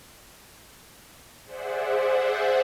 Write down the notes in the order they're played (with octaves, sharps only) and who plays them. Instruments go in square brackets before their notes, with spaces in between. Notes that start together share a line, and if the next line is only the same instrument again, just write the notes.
[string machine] G#4 C5 D5 E5 F#5